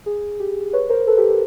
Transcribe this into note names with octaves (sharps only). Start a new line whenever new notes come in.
G#4
G4
B4 C#5
A#4 C5
A4 B4
G4 A4
G4 A4